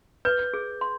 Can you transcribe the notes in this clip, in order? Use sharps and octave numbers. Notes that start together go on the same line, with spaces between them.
B4 G6
G#4
C6